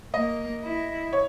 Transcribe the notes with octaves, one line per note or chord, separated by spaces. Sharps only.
A#3 D#5
E4
C#5